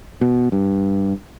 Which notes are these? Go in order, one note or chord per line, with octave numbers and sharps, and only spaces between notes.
B2
G2